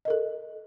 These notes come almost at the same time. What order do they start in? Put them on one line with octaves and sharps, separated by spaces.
D#5 A#4 A4